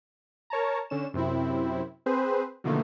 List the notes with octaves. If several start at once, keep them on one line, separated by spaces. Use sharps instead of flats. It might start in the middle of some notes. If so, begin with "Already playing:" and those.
A#4 C#5 A5 A#5
D3 C#4 E7
F#2 C3 C4 E4
C4 G#4 B4 C5
B2 D3 D#3 F3 A3 A#3